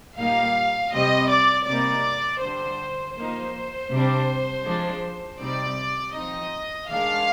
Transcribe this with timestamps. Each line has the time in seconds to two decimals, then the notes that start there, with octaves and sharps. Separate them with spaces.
0.17 A#2 G3 A#3 D#4 F5
0.92 C3 G3 C4 D#5
1.29 D5
1.67 C3 G3 A#3 D#4 D5
2.41 D3 G3 D4 C5
3.16 F3 A#3 D#4 C5
3.90 C3 G3 D4
4.66 F3 G#3 D4
5.40 C3 G3 C4 D#4 D5
6.14 F3 C4 D#4 D#5
6.89 D#3 G#3 D4 F5